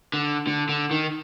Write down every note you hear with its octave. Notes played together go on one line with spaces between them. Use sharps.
D3
D3
D3
D#3